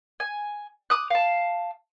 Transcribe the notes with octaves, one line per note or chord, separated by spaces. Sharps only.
G#5
D6 D#6 F#6
F5 A5